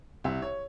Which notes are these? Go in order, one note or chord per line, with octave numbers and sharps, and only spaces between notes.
C2 E5
C#5